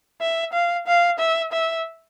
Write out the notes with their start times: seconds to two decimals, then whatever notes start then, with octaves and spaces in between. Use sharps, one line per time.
0.21 E5
0.53 F5
0.87 F5
1.19 E5
1.53 E5